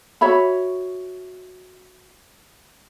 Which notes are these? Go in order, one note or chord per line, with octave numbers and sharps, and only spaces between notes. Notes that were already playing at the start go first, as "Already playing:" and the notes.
F#4 C#5 E5 B5